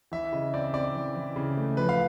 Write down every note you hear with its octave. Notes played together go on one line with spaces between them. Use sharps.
E3 E5
C#3 D#5
C4 D5
C4 D5
E3
E3
C#3
A3
F3 B4
F5